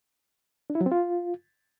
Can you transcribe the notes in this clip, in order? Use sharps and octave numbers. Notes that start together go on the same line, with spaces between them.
D4
E4
F#3
C4
F4